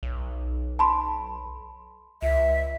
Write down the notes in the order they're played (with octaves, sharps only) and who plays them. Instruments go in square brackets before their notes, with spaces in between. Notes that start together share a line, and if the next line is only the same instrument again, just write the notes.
[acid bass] B1
[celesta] A5 B5 C6
[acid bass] C#2 [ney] E5